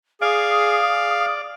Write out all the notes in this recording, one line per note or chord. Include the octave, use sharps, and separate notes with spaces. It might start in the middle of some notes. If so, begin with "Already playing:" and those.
G#4 D5 F5 D#6